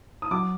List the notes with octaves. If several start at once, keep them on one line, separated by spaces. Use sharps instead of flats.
D#6
F#3 D6